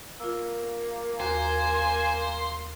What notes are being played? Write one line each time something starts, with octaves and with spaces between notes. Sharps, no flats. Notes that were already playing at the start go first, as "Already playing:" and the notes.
A#3 F4 E6
D#2 F#4 C5 G#5 A#5